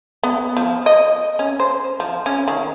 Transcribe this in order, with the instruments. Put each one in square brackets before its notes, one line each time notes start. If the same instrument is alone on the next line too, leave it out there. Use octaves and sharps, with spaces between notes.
[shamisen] B3
F3
D#5
C#4
C5
F3
C#4
D#3